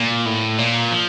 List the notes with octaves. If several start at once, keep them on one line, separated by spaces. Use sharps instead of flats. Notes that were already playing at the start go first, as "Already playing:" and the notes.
Already playing: A#2
A2
A#2
F3